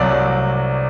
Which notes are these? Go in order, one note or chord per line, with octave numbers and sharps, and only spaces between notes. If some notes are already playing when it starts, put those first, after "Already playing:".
Already playing: C2 C3 F#3 D5